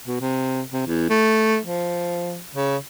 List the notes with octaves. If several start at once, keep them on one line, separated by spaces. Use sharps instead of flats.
B2
C3
C3
E2
A3
F3
C#3